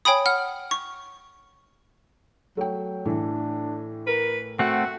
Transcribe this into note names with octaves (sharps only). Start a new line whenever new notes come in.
C#5 G5 G#5 B5 D#6
F#5 F6
C#6
F#3 A3 G5
A2 E3 D4
A#4 B4
A3 C4 F#4 F#5